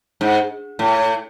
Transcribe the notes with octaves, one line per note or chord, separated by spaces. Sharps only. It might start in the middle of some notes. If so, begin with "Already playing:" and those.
G#2
A2